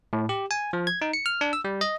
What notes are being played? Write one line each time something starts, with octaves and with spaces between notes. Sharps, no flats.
A2
G4
G#5
F3
G#6
D#4
C#7
F6
D4
E6
G3
D#5